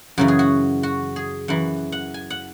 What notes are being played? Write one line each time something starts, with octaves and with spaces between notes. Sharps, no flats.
F#2 C#3 E3 F#4
G#4
F#4
F#4
G#4
F#2 E3 F#5
F#5
G#5
F#5